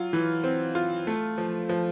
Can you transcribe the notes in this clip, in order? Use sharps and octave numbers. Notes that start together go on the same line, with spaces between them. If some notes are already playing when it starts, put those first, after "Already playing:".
Already playing: F#3 F4
E3
C4
F4
A3
F3
F3